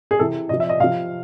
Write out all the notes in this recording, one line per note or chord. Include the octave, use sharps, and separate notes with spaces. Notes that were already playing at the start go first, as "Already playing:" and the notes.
G#4
C3 E3 A4
C3 F3 D#5
E5
D#5
C3 F3 F5